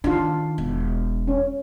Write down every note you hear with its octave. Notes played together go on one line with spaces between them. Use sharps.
D#3 D4 F4
E1
C#4